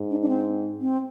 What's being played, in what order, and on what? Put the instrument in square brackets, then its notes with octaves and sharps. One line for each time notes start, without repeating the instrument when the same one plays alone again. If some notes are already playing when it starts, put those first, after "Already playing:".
Already playing: [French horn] G#2
[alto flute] D4
D4
C4
C4